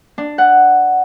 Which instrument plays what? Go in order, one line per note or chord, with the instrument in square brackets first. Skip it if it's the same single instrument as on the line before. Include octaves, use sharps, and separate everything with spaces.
[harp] D4
F#5